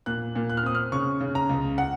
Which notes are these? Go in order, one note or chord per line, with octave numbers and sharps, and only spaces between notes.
A#2 F#6
A#2
F#6
F6
C4 D#6
F6
C#3 C#6
C#3
A#5
C#2
F#5